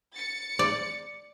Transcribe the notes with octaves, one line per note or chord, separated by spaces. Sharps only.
A6 C#7
D5